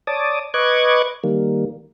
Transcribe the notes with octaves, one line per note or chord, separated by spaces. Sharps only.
C#5 D5 A5 D6 D#6
B4 D#5 C#6 D6 F#6 G#6
D#3 G3 A#3